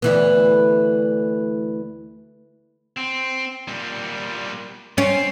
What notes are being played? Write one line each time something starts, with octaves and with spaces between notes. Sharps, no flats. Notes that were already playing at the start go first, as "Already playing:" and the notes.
D2 E3 B3
C4
A#2 G3
C4 C#4